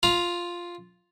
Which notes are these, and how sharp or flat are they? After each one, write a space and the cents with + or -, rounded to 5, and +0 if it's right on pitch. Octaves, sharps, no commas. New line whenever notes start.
F4 +0 F5 +0 A#5 +30